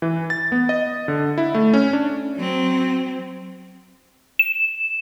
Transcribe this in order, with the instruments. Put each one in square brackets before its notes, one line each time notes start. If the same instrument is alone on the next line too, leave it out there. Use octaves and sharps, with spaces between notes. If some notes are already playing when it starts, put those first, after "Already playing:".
[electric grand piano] E3
A6
B3
D#5
D3
E4
A3
C#4
D4
[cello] F#3 C4
[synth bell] E7